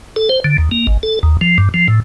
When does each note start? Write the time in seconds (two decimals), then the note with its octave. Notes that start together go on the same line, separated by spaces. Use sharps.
0.16 A4
0.29 C5
0.44 D3
0.58 D#2
0.71 A#3
0.87 G#1
1.03 A4
1.23 D#2
1.41 F3
1.58 G2
1.74 F3
1.88 A2